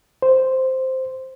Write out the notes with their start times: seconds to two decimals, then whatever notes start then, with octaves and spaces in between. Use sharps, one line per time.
0.22 C5